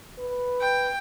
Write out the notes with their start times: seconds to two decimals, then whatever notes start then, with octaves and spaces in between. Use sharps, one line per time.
0.19 B4
0.61 G5